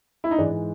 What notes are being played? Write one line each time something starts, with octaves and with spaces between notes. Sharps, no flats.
E4
D#4
G#2 E3 G#3 D4